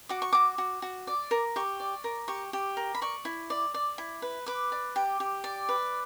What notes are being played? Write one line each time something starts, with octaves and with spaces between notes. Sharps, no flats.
F#4 D6
C#6
F#4 D6
F#4
F#4
D5
A#4
G4 C#6
D5
A#4
G4 C#6
G4
A#4
B5
D5 C#6
E4
D5
D5
E4
B4
B4 D6
D5
G4
G4
D5
B4